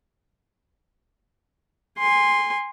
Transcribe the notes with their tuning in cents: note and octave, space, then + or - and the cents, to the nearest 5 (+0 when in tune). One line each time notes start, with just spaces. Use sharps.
G#5 -25 C6 +0